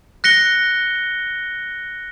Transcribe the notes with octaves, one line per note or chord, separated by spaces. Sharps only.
F#6 A#6 C#7 G7